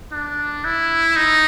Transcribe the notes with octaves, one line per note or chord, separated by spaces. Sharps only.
D4
E4
D#4